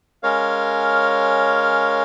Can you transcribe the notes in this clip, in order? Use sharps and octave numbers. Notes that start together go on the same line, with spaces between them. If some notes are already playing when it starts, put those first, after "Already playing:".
G#3 C#4 A#4 C#5 F5